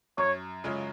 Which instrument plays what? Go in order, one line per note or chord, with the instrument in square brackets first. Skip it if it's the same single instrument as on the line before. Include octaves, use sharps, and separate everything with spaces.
[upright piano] F#2 [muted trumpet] C#5
[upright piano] C#3 G#3 C#4 F4